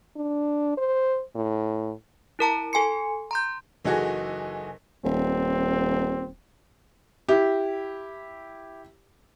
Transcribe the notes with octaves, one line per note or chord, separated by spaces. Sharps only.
D4
C5
A2
E4 A#4 A5 A#5
A4 G#5 C6 C#7
A#5 C6 G6
F#1 E3 D#4 F#4 G#4 A4
D#1 C4
E4 G4